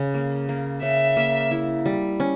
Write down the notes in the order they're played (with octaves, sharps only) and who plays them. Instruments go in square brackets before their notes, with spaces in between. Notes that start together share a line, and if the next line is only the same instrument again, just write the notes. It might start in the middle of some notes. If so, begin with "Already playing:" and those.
Already playing: [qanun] C#3
A#3
A#3
[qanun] C#3 [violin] E5
[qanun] A#3
E4
G3
C#4